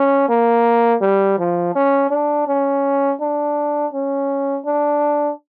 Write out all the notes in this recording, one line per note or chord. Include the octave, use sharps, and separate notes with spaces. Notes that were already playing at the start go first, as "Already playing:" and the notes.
Already playing: C#4
A#3
G3
F3
C#4
D4
C#4
D4
C#4
D4